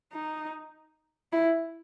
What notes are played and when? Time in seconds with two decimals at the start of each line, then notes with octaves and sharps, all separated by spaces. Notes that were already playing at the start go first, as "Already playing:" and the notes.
0.12 D#4
1.32 E4